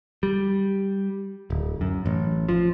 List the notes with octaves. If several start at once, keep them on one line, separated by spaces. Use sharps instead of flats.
G3
D1
F#2
A1
F3